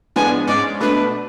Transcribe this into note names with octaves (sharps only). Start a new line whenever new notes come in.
A2 F3 G#3 B3 D4 G#5
G#2 G#3 C#4 D5
B2 A3 D4 B4